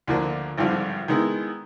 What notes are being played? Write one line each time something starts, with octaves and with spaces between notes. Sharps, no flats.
D2 D3 F3 A#3 D4
G#1 G2 D3 F3
D#3 G#3 B3 E4